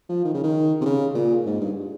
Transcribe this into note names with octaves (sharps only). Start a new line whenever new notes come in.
F3
D#3
C#3
D#3
C3
C#3
A#2
G#2
G2